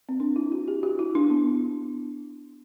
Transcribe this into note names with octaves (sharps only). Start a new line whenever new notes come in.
C4
D4
E4
F#4
G4
F#4
E4
D4
B3